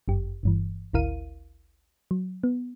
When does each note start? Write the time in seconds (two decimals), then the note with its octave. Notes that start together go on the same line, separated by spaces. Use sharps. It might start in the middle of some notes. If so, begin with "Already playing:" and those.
0.08 G1 F#2 G4
0.43 G1 G2 E3
0.93 G#1 D2 E4 A#4 F5 D#7
2.11 F#3
2.44 B3